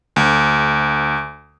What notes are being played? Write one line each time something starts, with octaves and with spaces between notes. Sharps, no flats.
D2